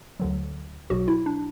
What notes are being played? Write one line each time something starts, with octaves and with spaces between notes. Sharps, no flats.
D2 D3 F#3
B1 B2 F#3 F#4
E4
D4